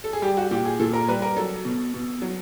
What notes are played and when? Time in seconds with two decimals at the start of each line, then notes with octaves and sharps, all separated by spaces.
0.04 A4
0.13 G#4
0.22 G3 G4
0.37 F#4
0.51 A#2 G4
0.65 G#4
0.80 A#2 A4
0.93 A#4
1.08 G3 B4
1.22 A#4
1.37 F#3 A4
1.65 B2
1.94 B2
2.22 F#3